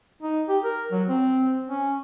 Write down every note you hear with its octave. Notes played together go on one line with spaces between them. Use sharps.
D#4
G4
A#4
F#3
C4
C#4